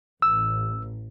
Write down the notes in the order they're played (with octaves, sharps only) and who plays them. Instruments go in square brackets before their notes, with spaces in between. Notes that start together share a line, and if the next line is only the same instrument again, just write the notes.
[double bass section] A1 [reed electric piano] E6